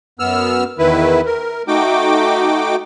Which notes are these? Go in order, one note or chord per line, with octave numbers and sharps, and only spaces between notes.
F#2 B3 E6 F6
E2 D#3 E4 B4
A#4
A3 D#4 F#4 G5 D6